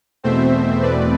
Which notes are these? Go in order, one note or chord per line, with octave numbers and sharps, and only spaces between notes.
E2 B2 A3 C4 C5 E5
B4 D5